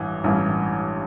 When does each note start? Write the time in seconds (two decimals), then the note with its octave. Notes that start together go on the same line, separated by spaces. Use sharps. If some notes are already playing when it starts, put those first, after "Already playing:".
Already playing: A1 G2 E3
0.24 A1 G2 E3